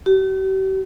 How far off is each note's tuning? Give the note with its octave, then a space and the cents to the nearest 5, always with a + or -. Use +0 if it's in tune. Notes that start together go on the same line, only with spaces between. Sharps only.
G4 -45